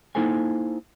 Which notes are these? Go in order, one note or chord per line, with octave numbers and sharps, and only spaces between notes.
A#3 D#4 E4 A4 C5 G#5